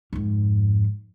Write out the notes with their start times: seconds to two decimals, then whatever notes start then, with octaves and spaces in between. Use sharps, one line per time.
0.13 F2 G#2